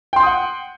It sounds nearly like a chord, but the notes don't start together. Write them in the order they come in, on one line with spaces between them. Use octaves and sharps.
G5 C6 G6 D#6 F#5